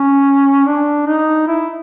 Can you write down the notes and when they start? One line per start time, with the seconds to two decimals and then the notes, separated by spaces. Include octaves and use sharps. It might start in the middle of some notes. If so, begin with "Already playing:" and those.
Already playing: C#4
0.66 D4
1.07 D#4
1.47 E4